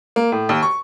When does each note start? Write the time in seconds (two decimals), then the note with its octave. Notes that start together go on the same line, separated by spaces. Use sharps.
0.16 A#3
0.32 A2
0.49 D#2
0.62 C#6